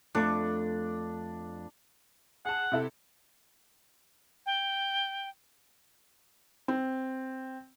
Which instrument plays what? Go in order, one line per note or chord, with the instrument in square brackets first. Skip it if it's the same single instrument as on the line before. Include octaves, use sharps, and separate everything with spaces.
[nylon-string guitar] F2 A3 [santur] D4 D6
[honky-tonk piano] G#4 A5 [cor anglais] F#5
[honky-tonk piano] C3 E4 A4
[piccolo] G5
[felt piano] C4